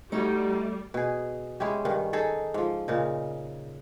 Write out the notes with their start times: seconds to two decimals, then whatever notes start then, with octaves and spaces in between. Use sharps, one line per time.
0.12 G3 A3 D#4 E4 F#4
0.94 B2 G#4
1.60 G#3 C#4 E4 G4
1.85 G2 D#3
2.13 D#4 G#4 A4
2.54 G#2 F3
2.88 A#2 C#3 D#4